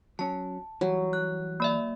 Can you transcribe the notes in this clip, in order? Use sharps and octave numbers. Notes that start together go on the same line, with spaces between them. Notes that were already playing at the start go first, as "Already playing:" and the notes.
F#3 C#4 A5
E3 F#3 G3
F#6
A#3 D5 E5